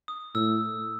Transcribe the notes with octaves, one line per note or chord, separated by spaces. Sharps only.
D#6
A2 E6